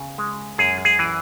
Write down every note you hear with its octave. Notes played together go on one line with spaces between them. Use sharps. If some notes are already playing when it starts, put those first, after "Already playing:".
Already playing: C#3 B3
G#3
F#2 G#4
G#4
E3